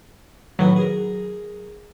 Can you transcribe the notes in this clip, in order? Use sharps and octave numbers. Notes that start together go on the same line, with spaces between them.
A2 D#3 F#3 B3 F#4
G#4 A#4